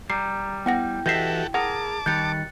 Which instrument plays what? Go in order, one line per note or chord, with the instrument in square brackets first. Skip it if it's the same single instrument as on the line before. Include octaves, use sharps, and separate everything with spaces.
[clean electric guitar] G3 [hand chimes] A#5 [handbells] C7
[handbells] B3 F#5 A#6 [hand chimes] E4 G5
[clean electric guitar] E3 D#5 E5 [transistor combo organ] F#4 G4 A4 [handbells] G6 C7
[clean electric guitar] G#4 A#4 [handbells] F#5 [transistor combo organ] A5 D6
[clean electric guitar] D#3 G3 [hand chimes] F#6 A6 C#7 [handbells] G6